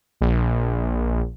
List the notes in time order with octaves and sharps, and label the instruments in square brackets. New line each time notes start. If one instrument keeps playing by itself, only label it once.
[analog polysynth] A#1